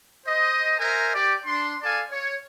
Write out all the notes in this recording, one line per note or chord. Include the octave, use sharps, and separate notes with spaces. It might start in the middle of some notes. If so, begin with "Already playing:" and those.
C5 D#5
A#4 C5 E5 G#5 A#5
G4 D5
D4 C6
A4 D5 F5 G#5 A5
C#5